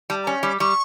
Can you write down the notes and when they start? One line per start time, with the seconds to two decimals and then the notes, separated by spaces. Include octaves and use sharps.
0.10 G3 A5
0.23 A#5
0.27 C#4
0.34 C#6
0.43 G3
0.48 D6
0.60 G3 C#6